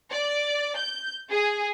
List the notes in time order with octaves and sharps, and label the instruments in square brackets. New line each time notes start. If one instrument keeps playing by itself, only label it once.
[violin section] D5
G6
G#4